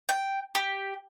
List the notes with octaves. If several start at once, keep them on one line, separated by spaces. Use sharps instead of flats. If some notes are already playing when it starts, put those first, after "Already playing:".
G5
G4